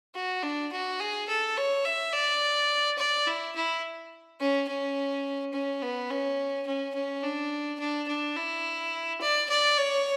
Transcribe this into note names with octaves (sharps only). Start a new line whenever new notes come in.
F#4
D4
F#4
G#4
A4
C#5
E5
D5
D5
E4
E4
C#4
C#4
C#4
B3
C#4
C#4
C#4
D4
D4
D4
E4
D5
D5
C#5